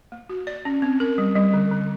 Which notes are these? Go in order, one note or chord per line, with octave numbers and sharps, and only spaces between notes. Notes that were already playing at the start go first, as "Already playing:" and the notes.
A#3
F#4
D5
C#4
C4
A#4
G3
G3
D3
D3